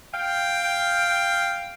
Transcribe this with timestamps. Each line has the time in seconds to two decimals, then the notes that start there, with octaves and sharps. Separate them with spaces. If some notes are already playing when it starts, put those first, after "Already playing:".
0.13 F5 G5